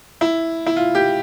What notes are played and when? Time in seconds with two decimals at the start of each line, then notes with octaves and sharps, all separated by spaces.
0.21 E4
0.66 E4
0.76 F4
0.95 G4